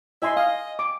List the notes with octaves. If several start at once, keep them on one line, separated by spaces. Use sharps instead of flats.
E4 D#5 G#5 C6
D#5 F5
D6